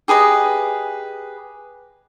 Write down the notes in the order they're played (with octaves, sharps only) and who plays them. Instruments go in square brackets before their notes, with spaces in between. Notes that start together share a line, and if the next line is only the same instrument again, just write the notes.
[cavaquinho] G4 G#4 B4 D#5